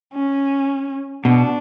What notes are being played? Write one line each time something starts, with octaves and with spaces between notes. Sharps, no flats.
C#4
B2 D4